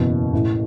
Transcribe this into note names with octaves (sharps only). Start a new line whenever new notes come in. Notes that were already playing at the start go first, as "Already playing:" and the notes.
Already playing: F#1 E2 B2
A1 A2 E3